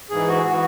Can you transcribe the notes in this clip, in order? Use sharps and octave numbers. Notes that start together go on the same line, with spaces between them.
G#2 E3 G#4
F#4
E3 F#4